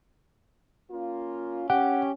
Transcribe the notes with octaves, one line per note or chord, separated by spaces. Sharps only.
A#3 C#4 F4
C#4 G4 F#5